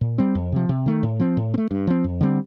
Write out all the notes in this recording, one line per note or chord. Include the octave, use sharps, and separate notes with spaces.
A#2
G3 C4
F2
C3 F3
C3
D#3 A3
A2
F3 C4
A2
C4
A3
G2
F3 C4
F2
D3 G3 C4